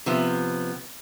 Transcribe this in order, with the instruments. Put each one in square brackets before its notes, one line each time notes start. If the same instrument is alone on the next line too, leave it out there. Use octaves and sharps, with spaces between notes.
[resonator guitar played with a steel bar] C3 F3 B3